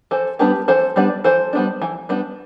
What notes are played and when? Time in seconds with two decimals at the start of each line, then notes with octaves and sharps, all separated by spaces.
0.11 E3 A4 C5
0.39 G3 B3 D4 G4 B4
0.68 E3 A4 C5
0.96 G3 B3 D4 B4 D5
1.24 E3 A4 C5
1.53 G3 B3 D4
1.82 E3
2.09 G3 B3 D4